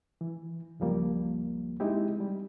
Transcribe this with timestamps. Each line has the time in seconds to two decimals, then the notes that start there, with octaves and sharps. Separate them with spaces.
0.21 E3
0.80 C#2 F#2 F3 G3 A#3
1.80 G#3 C4 D#4 E4 G4
2.21 G3